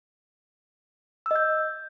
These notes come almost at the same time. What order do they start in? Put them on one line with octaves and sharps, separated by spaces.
E6 D#5 G6